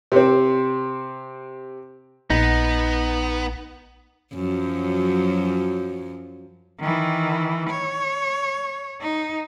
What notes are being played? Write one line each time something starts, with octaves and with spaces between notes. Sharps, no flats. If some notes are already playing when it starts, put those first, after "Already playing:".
C3 C4
A#1 B3 D#4
F#2 F3 F#3
D#3 E3
C#5
D#4